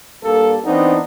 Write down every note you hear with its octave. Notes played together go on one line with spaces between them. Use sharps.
G2 A#3 A4
E3 B3 C4 D4 D#4